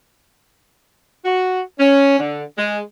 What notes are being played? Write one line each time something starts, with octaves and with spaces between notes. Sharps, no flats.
F#4
C#4
D3
G#3